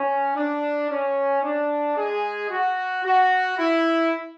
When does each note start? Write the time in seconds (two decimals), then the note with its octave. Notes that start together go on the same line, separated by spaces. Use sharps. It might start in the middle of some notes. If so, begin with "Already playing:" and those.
Already playing: C#4
0.36 D4
0.90 C#4
1.43 D4
1.97 G#3 G#4
2.50 F#4
3.05 F#4
3.58 E4